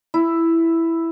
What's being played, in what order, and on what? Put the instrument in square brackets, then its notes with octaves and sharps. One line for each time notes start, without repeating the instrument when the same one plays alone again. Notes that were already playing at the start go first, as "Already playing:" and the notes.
[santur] E4